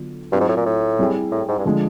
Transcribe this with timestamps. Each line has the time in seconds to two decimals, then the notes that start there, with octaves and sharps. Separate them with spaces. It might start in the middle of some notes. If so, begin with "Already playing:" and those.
Already playing: D3 F#3 B3 D4 F4
0.32 G2 F#3 A3 C4 F4
0.40 G#2
0.49 A2
0.57 A#2
0.66 A2
0.99 G3 C4 E4 G#4
1.32 A2
1.48 G#2
1.59 G2
1.65 D3 F3 G#3